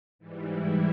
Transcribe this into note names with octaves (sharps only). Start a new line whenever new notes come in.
G#2 E3 G3
E4